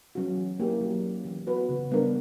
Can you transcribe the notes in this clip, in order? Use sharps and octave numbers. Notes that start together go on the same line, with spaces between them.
F#3 C#4 F#4
E3
A#3 E4 G4
F#3
C#4 G4
E3
B3 F#4 B4
C#3
G3 B3 D4 A#4